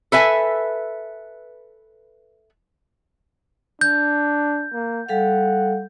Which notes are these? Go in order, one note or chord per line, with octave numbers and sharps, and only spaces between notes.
A4 B4 E5 G#5
D4 G6
A#3
G3 A4 F5 F#5